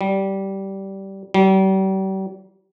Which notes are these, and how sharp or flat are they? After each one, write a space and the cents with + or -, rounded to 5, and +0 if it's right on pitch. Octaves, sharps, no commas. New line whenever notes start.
G3 -15
G3 -40